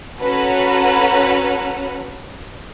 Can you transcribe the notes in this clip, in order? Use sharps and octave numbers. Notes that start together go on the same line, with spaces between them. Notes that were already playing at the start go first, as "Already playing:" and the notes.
C#4 F#4 A4 B4 F#5 A#5